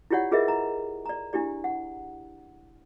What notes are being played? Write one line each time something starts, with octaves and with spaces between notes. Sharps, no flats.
E4 F4 G4 C#5 D5 F#5
F4 G#4 A#4 B4 D#5 E5
A#5
D5 A#5
D4 E4 G4 D5
F#5